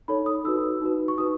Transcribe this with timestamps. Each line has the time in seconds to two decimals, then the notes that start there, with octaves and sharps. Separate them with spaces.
0.08 D#4 A4 C#5 B5
0.26 D#6
0.45 D#4 F#4 B4 E6
0.82 D#4 F#4 B4
1.08 C#6
1.18 D#4 F#4 B4 D#6